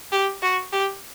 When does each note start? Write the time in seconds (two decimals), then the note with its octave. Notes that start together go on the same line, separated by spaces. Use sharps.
0.12 G4
0.42 F#4
0.73 G4